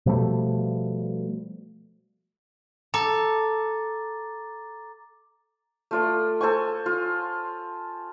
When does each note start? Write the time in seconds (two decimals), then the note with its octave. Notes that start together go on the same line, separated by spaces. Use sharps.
0.06 B2 F3 G3 A3
2.94 A4 A#5 D6 A6
5.91 A3 F4 D5
6.41 A4 C5 G#5 C#6
6.86 F4